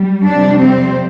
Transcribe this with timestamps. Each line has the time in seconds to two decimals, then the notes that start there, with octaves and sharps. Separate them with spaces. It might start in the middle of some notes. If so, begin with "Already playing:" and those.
Already playing: G3
0.28 F2 C3 G3 D4
0.63 C4